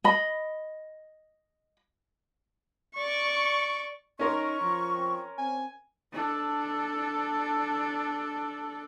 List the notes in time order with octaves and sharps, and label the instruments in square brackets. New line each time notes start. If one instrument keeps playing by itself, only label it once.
[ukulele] D#5 B5
[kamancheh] D5 C#6
[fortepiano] C#4 A#4 C6 [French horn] D#4 [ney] C#6
[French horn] F3
[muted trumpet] C4
[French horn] C4 [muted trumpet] G#5
[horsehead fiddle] D4 A4